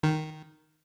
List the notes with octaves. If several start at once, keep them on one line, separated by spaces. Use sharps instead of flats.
D#3